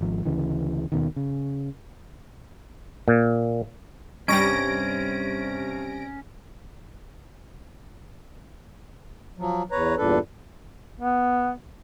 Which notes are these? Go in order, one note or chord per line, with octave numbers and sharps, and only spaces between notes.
G#1 F3
D2 C#3 E3
D#2 B2 D#3
C#3
A#2
G2 C3 G3 C#4 C#6 A#6 D7
F3 F#3
E2 B4 C#5 A#5
E2 G2 A#2 D4 A4 B4
B3